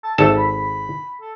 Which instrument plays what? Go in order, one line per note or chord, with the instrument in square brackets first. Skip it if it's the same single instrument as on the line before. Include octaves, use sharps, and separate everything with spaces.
[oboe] A5
[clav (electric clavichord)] G#1 A4 A5 [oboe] E5
[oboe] B5
A4